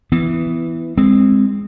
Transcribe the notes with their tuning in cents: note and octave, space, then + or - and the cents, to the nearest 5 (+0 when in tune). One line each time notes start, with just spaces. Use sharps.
E3 +0 B3 +20
G#3 -20 C4 +0